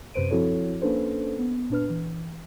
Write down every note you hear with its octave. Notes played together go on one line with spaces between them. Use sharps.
F#2 C3 B4 C5 D7 D#7
F3 C4 E4 F#4 A4 C#5
A#3 C#4 D4 A4 B4 C5
B3
A#2 D4 B4 F6
E3